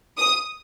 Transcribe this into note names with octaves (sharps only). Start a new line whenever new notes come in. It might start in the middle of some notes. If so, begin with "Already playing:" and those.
D#6